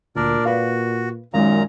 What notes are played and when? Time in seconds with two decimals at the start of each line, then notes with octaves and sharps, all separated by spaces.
0.16 D2 A#2 D4 A#4 D5
0.45 F#4 B4 D5 F5
1.34 F#2 A#2 D#3 G#3 C#4 F5 A#5